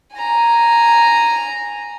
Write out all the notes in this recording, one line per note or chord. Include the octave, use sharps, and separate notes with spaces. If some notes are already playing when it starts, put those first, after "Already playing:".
G#5 A#5